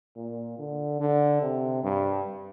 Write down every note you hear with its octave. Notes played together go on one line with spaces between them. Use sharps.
A#2
D3
D3
C3
G2